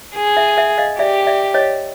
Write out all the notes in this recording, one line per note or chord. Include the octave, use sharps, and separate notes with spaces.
G#4
E5 F#5
E5 F#5
D#5 F5
G4 D5 E5
D5 E5
C#5 D#5